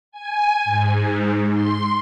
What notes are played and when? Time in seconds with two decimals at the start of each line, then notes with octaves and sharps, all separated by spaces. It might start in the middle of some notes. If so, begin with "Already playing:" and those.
0.12 G#5
0.65 G#2
1.52 C6